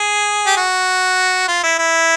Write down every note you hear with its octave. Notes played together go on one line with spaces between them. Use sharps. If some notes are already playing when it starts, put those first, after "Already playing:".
Already playing: G#4
G4
F#4
F4
E4
E4